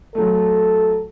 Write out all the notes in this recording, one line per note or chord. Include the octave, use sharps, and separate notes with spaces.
F#3 A3 A4